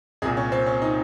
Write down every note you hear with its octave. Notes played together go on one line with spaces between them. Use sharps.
C2 A#2 G#4
C#4
C4
C#4
D#4